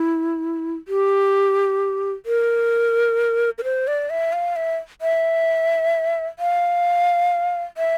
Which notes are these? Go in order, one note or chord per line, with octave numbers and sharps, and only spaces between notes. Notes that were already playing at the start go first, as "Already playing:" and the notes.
Already playing: E4
G4
A#4
A#4
C5
D5
E5
F5
E5
E5
F5
E5